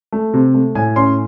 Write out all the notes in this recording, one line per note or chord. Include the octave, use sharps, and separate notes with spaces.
A3
C3
A3
A2 G#5
C#4 C6